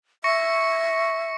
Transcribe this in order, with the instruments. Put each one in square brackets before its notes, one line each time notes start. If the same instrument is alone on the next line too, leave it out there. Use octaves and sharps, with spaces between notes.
[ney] E5 [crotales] C#6 A#6 C#7